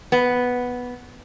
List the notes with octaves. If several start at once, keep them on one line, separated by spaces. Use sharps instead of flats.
B3